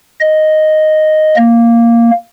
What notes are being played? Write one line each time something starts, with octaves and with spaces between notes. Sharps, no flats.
D#5
A#3